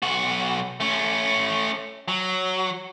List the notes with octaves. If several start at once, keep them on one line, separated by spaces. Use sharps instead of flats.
B1 F#4
A3 C#4
F#3